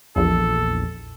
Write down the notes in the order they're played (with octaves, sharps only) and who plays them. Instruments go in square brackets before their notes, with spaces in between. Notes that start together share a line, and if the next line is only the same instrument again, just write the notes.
[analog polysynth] A#1 E2 [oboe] A4